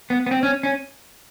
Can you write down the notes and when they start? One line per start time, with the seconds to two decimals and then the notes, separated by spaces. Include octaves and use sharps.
0.10 B3
0.26 B3
0.31 C4
0.43 C#4
0.63 C#4